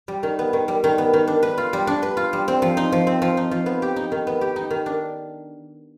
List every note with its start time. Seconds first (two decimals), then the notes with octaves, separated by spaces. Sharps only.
0.08 G3
0.23 D#3
0.39 B3
0.53 D#3
0.68 G3
0.84 D#3
0.98 B3
1.13 D#3
1.27 D4
1.43 B4
1.58 F4
1.73 G3
1.87 D4
2.02 B4
2.17 F4
2.33 G3
2.48 C4
2.62 F3
2.77 D#4
2.92 F3
3.07 C4
3.22 F3
3.37 D#4
3.51 F3
3.66 B3
3.82 G4
3.96 D#4
4.12 D#3
4.27 B3
4.41 G4
4.56 D#4
4.70 D#3
4.86 D4